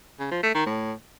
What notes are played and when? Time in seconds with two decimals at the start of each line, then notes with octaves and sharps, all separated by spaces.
0.20 C#3
0.31 F3
0.43 A3
0.54 D#3
0.66 A2